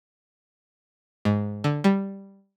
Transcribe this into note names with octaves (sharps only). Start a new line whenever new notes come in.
G#2
D3
G3